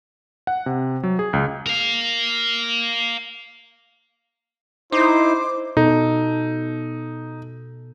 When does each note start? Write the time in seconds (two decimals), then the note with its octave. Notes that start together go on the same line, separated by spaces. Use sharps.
0.47 F#5
0.66 C3
1.03 F#3
1.19 G#4
1.33 C#2
1.67 A#4 F5
4.92 D#4 E4 C5 D6
5.77 B2 D#4 A4